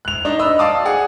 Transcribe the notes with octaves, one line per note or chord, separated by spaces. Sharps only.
F#6 F7
D4 D#4
D#5 B5 E6
D5 F5 A5 D6 D#6
G#4 F#5